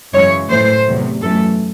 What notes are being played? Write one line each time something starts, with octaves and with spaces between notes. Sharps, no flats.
F#2 C#3 E3 G#3 C#5
A2 E3 A3 C5
E2 C3 F#3 A3
F#2 E3 A3 A4